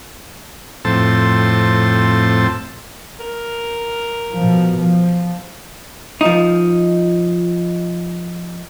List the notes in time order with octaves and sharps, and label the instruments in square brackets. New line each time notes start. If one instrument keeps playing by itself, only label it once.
[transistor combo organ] F2 A2 C4 A5
[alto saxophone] A#4
[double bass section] B2 F3
F3
[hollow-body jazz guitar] F3 D#4